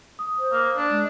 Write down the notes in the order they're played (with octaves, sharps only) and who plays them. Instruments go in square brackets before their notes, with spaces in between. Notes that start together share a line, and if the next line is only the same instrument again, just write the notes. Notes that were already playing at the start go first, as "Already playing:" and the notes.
[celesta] D#6
[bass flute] C5
[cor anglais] A#3
D4
[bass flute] G#3